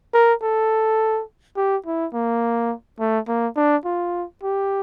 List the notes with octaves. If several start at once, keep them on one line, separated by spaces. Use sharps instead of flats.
A#4
A4
G4
E4
A#3
A3
A#3
D4
F4
G4